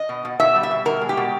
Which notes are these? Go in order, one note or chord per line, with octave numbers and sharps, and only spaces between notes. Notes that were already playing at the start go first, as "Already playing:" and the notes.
Already playing: D#5
B2
B2
B2 E5
G3
E5
B2
B2 A#4
G#3
G4
B2